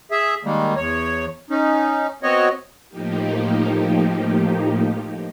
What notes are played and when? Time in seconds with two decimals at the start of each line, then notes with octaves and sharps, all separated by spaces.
0.11 G#4 E5
0.45 D#3 G3 G#3 A#3
0.76 E2 C#5
1.50 C#4 D#4
2.23 B3 C4 F#4 C#5 D#5
2.89 A2 F3 A#3 D#4 G4